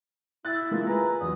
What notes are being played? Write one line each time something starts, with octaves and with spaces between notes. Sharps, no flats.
E4 F#6 A6
G#3 A#3 F4
G#4 B4 G#5 A#5
E2 F#3 D#6